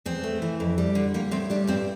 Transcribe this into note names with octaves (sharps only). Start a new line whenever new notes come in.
E2 C4
A3
E3
F2
G3
D3
G3 A#3
A2 C4
G3 D4
G2 C4